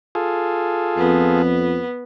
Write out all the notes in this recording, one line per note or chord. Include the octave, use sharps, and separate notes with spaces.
F4 G#4 A4
F2 B3